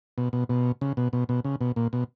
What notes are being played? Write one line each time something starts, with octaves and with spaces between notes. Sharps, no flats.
B2
B2
B2
C#3
B2
B2
B2
C#3
B2
A#2
B2